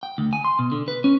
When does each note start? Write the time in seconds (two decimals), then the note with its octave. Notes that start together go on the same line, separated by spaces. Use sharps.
0.03 G5
0.18 D2
0.33 G#5
0.45 C6
0.59 B2
0.72 D3
0.88 B4
1.04 C#4